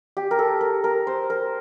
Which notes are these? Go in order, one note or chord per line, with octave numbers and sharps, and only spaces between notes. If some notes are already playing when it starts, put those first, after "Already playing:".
G4
A#4
A4
A#4
A#4
C5
A#4